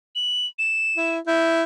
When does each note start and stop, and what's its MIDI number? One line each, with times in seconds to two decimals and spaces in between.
0.15 0.46 102
0.59 1.14 100
0.97 1.19 64
1.27 1.64 64
1.27 1.64 91